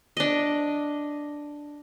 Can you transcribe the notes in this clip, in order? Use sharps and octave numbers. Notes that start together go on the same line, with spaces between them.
D4 D#5